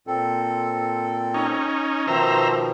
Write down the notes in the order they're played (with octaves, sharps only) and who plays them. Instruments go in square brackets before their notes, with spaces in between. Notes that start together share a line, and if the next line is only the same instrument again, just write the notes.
[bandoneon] A#2 C4 A4
[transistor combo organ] C#4 D#4
[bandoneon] B2 D#3 F3 [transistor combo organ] C5 E5 A#5